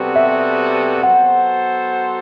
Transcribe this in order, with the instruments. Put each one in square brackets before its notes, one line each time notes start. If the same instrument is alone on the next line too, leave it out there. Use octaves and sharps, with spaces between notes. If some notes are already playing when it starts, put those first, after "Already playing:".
Already playing: [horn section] C3 G3 B3 F#4 A4
[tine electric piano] E5
[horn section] F#3 B3 F#4 A4 C5 [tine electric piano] F#5